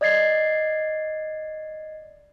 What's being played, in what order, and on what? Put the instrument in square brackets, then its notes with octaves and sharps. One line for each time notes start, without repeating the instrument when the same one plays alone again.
[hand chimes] D5 D#5 G#6 A6 C7